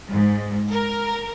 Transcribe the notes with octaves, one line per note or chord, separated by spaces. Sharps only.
G#2
A#4